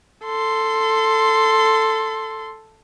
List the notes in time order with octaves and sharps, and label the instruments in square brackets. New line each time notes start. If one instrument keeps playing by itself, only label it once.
[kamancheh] A4 C6